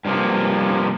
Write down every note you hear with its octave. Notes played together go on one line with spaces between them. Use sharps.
G2 C3 F3 A#3